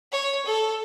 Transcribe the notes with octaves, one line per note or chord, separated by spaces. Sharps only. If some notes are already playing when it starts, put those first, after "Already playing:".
C#5
A4